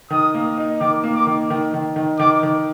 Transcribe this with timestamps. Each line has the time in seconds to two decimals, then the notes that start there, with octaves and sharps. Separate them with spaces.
0.10 D#3 D#6
0.34 A#3
0.58 D#4
0.80 D#3 D6
1.04 A#3
1.15 D6
1.27 D#3
1.50 D#3
1.74 D#3
1.96 D#3
2.19 D#3 D6
2.43 D#3